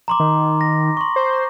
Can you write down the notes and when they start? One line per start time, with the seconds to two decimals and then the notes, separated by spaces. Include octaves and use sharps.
0.08 A#5 C6 D6
0.20 D#3
0.61 A#6
0.97 C6 C#6
1.16 C5